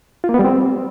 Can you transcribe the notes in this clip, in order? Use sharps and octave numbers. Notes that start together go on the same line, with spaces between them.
F4
A#3
B3
G3
C4